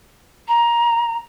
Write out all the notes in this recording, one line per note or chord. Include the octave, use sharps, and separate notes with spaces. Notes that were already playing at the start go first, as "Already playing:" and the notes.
A#5